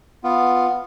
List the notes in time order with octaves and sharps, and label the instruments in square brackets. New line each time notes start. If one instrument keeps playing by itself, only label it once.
[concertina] B3 F4